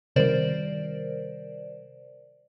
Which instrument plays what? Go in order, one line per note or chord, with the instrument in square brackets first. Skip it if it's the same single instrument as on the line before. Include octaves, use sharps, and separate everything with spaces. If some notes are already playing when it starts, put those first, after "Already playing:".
[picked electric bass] C3 D#3 G3 [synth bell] A#4 C5 D5